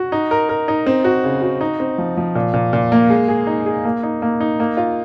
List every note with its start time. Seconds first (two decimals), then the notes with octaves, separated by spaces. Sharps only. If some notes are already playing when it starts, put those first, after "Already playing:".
Already playing: F#4
0.12 D#4
0.31 A#4
0.49 A#4
0.68 D#4
0.86 C4
1.04 F#4
1.24 C#3
1.42 F#4
1.61 D#4
1.80 C4
1.98 F3
2.17 F3
2.35 A#2
2.53 A#2
2.73 A#2
2.92 A#3
3.10 G#3
3.28 G#4
3.47 D#4
3.66 G#4
3.85 A#3
4.03 D#4
4.22 A#3
4.40 D#4
4.60 A#3
4.77 F4